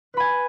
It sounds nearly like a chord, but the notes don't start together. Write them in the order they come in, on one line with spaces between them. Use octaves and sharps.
B4 B5 G#5